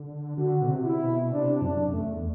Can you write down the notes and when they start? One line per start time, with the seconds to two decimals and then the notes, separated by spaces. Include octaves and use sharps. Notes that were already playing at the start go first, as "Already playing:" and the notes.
Already playing: D3
0.38 D3 F#4
0.62 B2
0.69 C3
0.84 E4
1.01 B2
1.31 C3 D4
1.61 F#2 D4
1.88 F#2
1.92 E2 A3